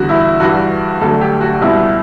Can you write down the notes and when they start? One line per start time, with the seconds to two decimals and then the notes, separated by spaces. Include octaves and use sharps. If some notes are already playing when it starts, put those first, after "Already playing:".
Already playing: E2 D3 G3 F#4
0.09 E4
0.39 G2 E3 G3 F#4
1.01 D2 D3 F#3 A4
1.21 G4
1.41 F#4
1.61 C#2 B2 G3 E4